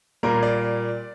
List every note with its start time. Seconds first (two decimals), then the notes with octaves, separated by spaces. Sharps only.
0.23 A#2 G3 A#3 A#4
0.43 D5